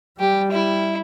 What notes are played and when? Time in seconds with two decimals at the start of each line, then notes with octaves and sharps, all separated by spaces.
0.19 G3 G4
0.52 E4